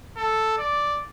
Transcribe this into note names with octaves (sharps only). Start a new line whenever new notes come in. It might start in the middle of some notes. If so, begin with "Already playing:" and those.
A4
D5